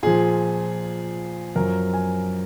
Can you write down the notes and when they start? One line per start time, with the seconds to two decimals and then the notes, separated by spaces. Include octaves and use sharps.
0.03 A#2 F3 G#4
1.56 F#2 F3 A#4
1.93 G#5